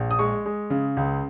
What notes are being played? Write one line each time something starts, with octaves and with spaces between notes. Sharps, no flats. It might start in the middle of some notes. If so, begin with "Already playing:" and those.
Already playing: A#1
D#6
G#3 C#6
G#3
C#3
C#2